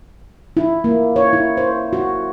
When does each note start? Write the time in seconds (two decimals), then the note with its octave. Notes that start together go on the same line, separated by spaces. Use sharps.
0.57 E4
0.84 A#3
1.16 C#5
1.33 E4
1.57 C5
1.93 F#4